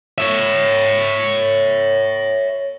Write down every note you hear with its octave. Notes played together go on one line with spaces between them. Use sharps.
C#5 E5